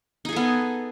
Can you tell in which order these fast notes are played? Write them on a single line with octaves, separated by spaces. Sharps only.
D#4 G#4 A4 B3